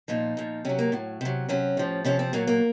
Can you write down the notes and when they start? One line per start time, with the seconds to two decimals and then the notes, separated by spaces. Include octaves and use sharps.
0.08 A#2 F3 D#4
0.37 A#2 F3
0.65 C3 F#3 C#4
0.79 A#3
0.92 A2 F#3
1.21 C3 F#3
1.49 C3 F#3 C#4
1.77 A2 F3
2.04 C3 F3 C#4
2.19 C4
2.33 A#2 F#3 A#3
2.47 A#3